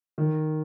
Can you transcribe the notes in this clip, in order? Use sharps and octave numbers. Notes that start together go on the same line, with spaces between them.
D#3